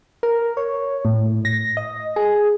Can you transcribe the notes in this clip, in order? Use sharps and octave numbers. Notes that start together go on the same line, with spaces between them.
A#4
C#5
A2
A#6
D#5
G#4